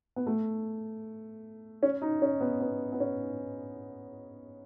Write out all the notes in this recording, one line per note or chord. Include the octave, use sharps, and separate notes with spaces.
B3
A3
C#4
D#4
C#4
B3
B3
B3
C#4